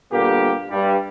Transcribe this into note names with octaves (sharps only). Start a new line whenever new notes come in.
A#2 D3 G3 A#3 B3 G4
G2 G3